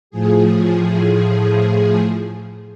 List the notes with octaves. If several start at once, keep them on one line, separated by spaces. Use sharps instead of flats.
A2 F3 G#4